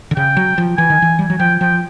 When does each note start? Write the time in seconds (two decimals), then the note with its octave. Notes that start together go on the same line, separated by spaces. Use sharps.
0.11 D3
0.16 C#3 G5
0.37 F#3
0.58 F3
0.78 E3 G#5
0.90 D#3
1.02 E3
1.19 G3
1.30 F#3
1.40 F3 G5
1.61 F3 G5